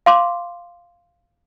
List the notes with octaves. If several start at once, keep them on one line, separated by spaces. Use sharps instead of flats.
F5 C6 D6